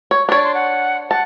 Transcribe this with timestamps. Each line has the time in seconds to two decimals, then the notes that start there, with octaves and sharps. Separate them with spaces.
0.11 C#5
0.29 D4 C#5 D5
0.43 C6
0.55 F#5
1.11 F#5 A5